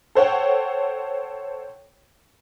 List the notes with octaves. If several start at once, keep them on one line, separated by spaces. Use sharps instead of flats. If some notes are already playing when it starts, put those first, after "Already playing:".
A4 C5 C#5 F#5 G5